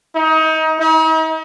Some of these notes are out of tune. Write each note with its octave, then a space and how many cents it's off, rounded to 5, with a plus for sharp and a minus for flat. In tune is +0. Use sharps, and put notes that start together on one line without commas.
D#4 +30
D#4 +45